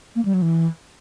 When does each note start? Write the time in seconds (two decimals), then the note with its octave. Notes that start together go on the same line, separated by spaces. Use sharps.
0.16 A#3
0.25 G3
0.34 F#3
0.42 E3